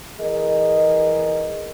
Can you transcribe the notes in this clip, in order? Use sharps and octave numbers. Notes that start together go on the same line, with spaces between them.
E3 G#4 A#4 D#5